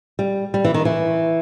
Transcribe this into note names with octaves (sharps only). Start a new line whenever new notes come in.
G3
G3
E3
D#3
E3